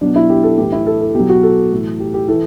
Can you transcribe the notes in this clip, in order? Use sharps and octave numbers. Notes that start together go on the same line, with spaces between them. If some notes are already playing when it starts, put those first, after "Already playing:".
B2 F#3 D4
E4
G4
A4
A2 E3 G4
E4
A4
A4
B2 F#3 G4
F#4
A4
A2 E3
G4
G4
E3 A4